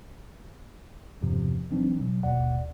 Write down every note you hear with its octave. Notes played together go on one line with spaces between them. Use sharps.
E2 G2 C3 F3
E3 F#3 C4 D4 D#4
B2 F#3
G1 D#2 B2 D5 F#5